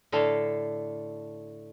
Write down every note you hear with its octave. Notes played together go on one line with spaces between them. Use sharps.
A2 D3 A4 F5